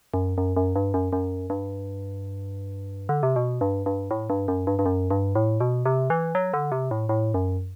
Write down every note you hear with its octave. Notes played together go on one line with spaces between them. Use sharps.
F#2
F#2
F#2
G2
F#2
F#2
G2
D3
C3
B2
G2
G2
A2
G2
F#2
G2
G2
F#2
G2
A2
B2
C3
E3
F#3
D3
C3
A2
A2
F#2